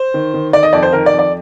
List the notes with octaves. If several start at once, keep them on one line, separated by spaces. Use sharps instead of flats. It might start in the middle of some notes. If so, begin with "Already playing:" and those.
Already playing: C5
D#3
D#3
D#3 D5
D#5
F2 D5
C5
D#3 A#4
D5
F2
D5